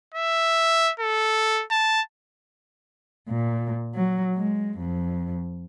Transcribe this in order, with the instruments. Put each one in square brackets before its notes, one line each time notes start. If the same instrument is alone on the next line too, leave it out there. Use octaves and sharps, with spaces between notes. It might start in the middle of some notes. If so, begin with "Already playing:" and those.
[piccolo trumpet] E5
A4
A5
[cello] A#2
F#3
G#3
F2